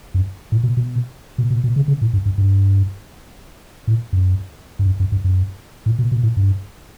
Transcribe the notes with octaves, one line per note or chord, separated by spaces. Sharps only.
F#2
A2
B2
B2
B2
B2
B2
C#3
C#3
A2
G2
G2
G2
A2
F#2
G2
F#2
F#2
G2
F#2
A2
B2
B2
A2
G2